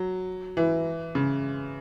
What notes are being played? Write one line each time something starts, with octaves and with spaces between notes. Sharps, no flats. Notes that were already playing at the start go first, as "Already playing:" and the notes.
Already playing: F#3
E3
C#3